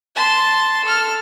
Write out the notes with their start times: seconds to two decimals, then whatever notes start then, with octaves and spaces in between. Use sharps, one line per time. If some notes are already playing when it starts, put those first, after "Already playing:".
0.15 A5 C6
0.84 A4 F6